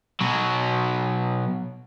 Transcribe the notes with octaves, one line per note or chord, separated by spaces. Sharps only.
B2 F#3